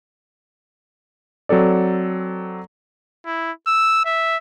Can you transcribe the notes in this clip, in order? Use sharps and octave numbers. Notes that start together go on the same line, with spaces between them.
F#3 C4 A4 D5
E4
E6
E5